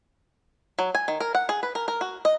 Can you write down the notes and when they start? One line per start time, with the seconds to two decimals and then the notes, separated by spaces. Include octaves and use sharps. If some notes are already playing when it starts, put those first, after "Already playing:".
0.79 F#3
0.95 G#5
1.08 D#3
1.20 A#4
1.35 F#5
1.49 G#4
1.63 B4
1.75 A#4
1.88 A#4
2.01 F#4
2.25 D#5